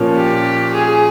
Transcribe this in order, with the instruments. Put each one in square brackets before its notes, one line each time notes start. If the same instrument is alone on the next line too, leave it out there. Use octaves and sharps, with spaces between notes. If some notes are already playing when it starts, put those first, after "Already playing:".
Already playing: [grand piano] A#2 F3 A#3 C#4
[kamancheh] G4
G#4